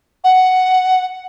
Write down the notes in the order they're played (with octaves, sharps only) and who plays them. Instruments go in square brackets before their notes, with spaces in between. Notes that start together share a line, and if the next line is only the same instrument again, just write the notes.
[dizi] F#5